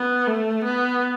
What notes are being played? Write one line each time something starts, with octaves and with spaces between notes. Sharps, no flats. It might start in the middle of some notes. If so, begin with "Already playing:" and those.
Already playing: B3
A3
B3